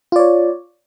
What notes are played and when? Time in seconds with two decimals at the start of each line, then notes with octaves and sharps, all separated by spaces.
0.12 F4
0.16 D5
0.19 C#5